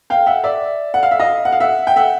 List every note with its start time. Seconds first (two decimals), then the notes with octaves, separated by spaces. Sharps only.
0.10 F5 G5
0.26 E5 F#5
0.44 D5 E5
0.94 F#5
1.03 F5
1.11 E5
1.20 D#5 F5
1.45 F#5
1.52 F5
1.60 E5 F#5
1.87 G5
1.96 E5 F#5